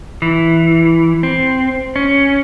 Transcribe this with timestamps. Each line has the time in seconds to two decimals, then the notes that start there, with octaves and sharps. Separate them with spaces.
0.22 E3
1.23 C4
1.96 C#4